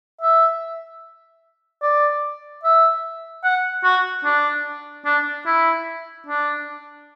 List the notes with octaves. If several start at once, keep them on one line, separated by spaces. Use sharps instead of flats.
E5
D5
E5
F#5
F#4
D4
D4
E4
D4